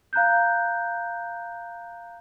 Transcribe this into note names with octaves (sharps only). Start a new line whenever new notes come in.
F5 A#5 F#6 G6